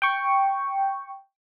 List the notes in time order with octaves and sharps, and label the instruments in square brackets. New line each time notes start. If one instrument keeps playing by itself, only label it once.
[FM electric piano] G5 C#6